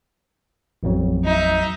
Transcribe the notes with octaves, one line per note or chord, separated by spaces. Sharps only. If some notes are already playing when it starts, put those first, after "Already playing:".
A1 F2 F#3
D#4 E5